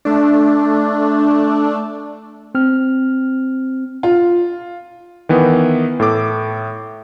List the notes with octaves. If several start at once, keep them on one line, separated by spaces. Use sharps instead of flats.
A3 D4
C4 F6
F4
D#3 E3 B3
A2 A4 D6